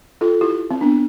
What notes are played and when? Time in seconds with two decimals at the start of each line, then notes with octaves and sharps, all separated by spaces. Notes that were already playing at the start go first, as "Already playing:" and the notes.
0.21 F4 A4
0.41 E4 G4
0.71 C4
0.81 B3 D4